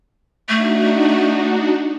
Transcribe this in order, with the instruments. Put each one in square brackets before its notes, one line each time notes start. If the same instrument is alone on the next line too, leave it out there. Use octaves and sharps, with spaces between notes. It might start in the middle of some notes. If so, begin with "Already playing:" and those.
[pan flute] A3 [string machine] D4 D#4 F#4